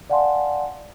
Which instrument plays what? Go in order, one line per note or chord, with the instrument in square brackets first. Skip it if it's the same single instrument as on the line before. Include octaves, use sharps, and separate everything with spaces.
[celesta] D5 F5 F#5 G#5 A5 C6